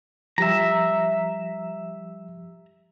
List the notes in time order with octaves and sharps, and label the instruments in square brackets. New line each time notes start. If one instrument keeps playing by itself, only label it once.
[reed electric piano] F3 G3 G4 [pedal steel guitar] E5 A#5